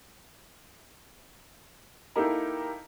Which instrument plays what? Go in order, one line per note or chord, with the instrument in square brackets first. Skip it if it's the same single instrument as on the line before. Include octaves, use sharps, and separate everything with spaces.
[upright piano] A#3 D#4 E4 G4 A4 A#4